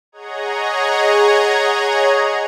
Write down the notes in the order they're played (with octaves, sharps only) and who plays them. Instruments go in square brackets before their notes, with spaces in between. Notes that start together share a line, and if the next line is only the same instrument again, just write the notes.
[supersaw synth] G#4 C#5 D#5 F#5 A#5 G#6